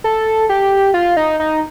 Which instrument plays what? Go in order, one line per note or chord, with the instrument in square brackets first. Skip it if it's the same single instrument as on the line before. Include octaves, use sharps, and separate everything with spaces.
[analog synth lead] A4
G4
F4
D#4
D#4